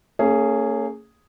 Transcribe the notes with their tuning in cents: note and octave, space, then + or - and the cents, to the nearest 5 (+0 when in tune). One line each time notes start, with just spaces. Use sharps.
A#3 -45 C#4 +0 G#4 +0